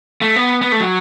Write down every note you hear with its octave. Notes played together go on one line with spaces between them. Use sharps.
A3
B3
B3
A3
F#3